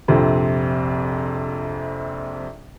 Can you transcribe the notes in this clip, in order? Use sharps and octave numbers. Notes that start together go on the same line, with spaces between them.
A#1 F2 C3